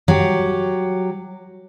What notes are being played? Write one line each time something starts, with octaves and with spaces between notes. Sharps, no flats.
F#3 G4